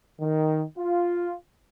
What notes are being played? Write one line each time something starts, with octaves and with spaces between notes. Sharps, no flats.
D#3
F4